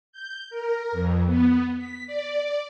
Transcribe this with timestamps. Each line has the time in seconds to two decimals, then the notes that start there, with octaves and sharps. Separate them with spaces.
0.12 G6
0.50 A#4
0.92 F2
1.26 B3
1.77 B6
2.07 D5